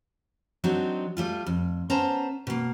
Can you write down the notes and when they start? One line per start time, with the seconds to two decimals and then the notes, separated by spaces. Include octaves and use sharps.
0.64 F#3 C4 D4 D#4
1.17 G3 A3 F4
1.47 F2
1.90 B3 C#4 C5 A5 A#5
2.47 B2 A#3